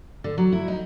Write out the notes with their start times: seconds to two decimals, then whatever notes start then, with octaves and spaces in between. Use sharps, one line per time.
0.24 D3
0.38 F#3
0.52 E4
0.68 D#4